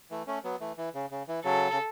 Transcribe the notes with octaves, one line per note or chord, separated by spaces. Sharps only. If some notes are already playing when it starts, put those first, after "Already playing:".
E3 A3
A3 C#4
F#3 B3
E3 A3
E3
C#3
C#3
E3
C#3 F#3 A4
C#3